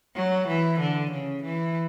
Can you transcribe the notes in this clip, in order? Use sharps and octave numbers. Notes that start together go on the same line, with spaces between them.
F#3
E3
D3
C#3
E3